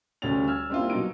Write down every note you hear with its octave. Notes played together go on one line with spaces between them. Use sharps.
D2 G3 A3 C#4 A6 F7
E6 F6 G#6
G3 A#3 C4 D4 E4 F4
B2 F#3 D#4 D7